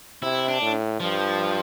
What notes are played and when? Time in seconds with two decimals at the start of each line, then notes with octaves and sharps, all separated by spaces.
0.22 C3 E4
0.48 D4
0.62 A2
1.00 G2 F3